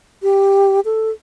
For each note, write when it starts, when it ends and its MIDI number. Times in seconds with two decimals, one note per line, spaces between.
0.23 0.80 67
0.85 1.10 69